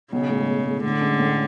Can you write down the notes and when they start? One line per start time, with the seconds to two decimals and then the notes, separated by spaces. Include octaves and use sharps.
0.12 B1 C#3
0.30 A2 G#3
0.47 B1
0.66 A2 G#3
0.84 A2 D3
1.01 G#3 C#4
1.19 A2